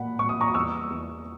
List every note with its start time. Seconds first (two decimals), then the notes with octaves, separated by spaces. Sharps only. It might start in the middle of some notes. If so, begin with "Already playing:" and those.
Already playing: A#2 A#3 F#5 B5
0.19 A#2 C#6
0.29 D#6
0.41 A#5 C#6
0.48 D#6
0.54 E2 C#6 E6
0.90 E2